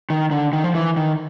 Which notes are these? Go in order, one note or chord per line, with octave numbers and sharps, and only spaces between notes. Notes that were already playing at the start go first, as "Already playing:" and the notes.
D#3
D3
D#3
F3
E3
D#3